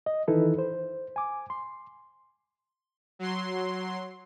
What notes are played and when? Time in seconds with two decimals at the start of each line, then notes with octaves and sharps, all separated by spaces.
0.06 D#5
0.28 D#3 E3 D#4 E4 A4 B4
0.58 C5
1.16 G#5 D6
1.50 C6
3.19 F#3 C6